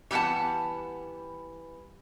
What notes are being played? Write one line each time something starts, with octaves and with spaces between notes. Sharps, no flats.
E3 G3 B3 F#5 A5